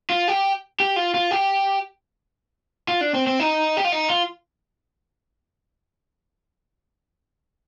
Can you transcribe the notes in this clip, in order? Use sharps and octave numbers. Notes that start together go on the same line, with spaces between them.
F4
G4
G4
F4
F4
G4
F4
D4
C4
C4
D#4
G4
F4
D#4
F4